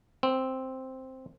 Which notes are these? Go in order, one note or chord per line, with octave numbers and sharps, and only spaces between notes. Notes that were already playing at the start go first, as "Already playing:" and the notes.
C4